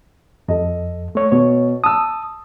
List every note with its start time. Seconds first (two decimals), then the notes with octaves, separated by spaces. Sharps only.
0.48 F2 A4 D#5
1.15 A3 C#5
1.32 B2 C#5
1.84 A5 D#6 E6